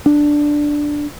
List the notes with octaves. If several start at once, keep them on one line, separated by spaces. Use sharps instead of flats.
D4